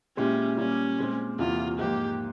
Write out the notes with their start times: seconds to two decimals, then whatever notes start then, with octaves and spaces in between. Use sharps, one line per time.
0.17 A#2 G#3 C#4 E4 G4
0.57 A#2 G3 A#3 C#4
0.99 A#2 G#3 C4
1.39 E2 C3 E3 A#3 F4
1.79 G#2 F3 A#3 G4